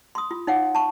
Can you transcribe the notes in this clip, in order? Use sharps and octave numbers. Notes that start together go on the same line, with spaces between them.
C6 D#6
F4
D#4 C#5 F5 F#5
A5 C#6